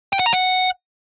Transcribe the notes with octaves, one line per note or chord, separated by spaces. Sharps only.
G5
F#5
A#5
F#5